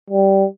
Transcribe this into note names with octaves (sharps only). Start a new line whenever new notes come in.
G3